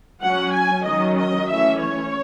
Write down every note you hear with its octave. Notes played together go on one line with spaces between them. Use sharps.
F#3 C#4 F#5
G#5
D#3 F#3 C#4 D#5
D#5
E3 A3 C#4 E5
C#5